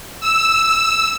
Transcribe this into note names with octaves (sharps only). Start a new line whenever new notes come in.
E6